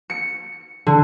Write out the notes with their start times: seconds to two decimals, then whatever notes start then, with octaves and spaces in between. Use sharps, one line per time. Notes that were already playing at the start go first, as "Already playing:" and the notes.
0.10 C#7
0.87 D3